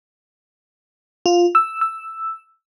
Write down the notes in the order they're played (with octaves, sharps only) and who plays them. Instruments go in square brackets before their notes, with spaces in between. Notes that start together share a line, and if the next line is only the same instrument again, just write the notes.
[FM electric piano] F4
E6
E6